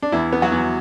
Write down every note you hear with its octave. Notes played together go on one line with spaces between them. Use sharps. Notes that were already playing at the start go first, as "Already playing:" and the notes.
D4
E2 E4
B3
F#3 F#4
E2